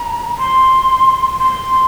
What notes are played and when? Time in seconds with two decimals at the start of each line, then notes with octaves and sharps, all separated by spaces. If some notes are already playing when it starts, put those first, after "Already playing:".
Already playing: A#5
0.39 C6
1.39 C6